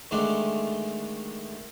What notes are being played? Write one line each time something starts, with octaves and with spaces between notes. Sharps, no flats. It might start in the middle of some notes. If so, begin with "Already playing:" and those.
D3 D#3 G#3 A3 D4